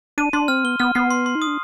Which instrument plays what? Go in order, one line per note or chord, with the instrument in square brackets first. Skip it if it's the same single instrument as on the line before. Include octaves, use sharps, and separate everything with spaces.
[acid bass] D4 [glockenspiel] D#7
[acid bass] D4 [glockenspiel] C6
[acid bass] C4 [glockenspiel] F6
[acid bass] B3 [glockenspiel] G7
[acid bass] B3 [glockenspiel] F6
[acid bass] B3 [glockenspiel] C7
[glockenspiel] C6
C6
[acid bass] D#4
[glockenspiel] D#6
[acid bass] D4